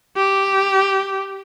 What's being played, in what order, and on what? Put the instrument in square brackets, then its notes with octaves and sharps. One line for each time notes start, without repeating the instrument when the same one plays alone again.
[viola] G4